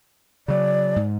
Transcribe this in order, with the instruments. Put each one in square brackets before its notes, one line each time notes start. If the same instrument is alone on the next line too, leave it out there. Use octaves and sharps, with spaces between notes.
[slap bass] C#3 F#3 [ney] D5
[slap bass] G#2